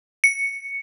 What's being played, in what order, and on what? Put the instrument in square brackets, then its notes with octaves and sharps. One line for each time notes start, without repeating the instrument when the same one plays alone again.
[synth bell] C#7